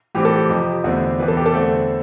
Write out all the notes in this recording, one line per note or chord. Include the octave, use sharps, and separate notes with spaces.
A2 E3 G3 C4 G4
A4
G4
F2 C3 F3
E2 D3 A3 C4
E2 C3 E3 G3 B4
A4
G4
A4
E2 D3 A3 C4